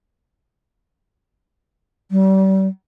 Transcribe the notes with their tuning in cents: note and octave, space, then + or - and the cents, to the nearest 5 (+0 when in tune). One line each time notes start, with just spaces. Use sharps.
G3 -35